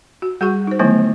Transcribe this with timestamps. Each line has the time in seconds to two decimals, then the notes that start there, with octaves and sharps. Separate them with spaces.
0.22 F#4
0.41 G3 F#4 G#4 F#5 C#6
0.67 D#4 C5
0.79 D3 D#3 F#3 A3 B3 E4